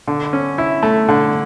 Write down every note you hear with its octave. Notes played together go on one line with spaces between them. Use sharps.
D3
C#4
E4
A3
D3